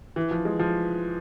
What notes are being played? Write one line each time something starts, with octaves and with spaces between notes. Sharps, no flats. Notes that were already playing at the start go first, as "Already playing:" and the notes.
E3
F3
G#3
F3